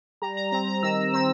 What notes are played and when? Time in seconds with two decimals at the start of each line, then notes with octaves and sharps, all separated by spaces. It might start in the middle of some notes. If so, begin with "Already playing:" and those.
0.22 G3 A#5
0.37 A#5
0.52 C4 A#5
0.67 A#5
0.83 D#3 E6
1.14 C4 E6